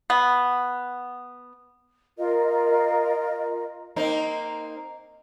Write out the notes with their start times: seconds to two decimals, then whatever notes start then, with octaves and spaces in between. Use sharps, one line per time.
0.10 B3
2.18 F4 A#4 D#5
3.96 A#3 C4 D#4